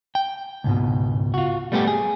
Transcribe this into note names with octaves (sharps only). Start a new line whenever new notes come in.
G5
C#2 G#2 B2
F4 F#4
G3 A3 B3 E4 G4
G#4